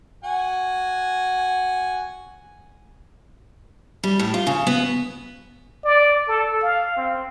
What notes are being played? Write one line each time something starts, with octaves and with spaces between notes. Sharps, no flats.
F#4 F#5 G#5
G3
A2
F4
C#3
B3
D5
A4
F5
C4